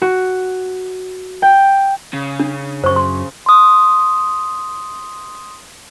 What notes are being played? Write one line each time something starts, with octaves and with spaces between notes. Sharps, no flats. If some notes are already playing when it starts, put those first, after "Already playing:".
F#4
G5
C#3
D4
F#2 C5 C#6
C6
C6 D#6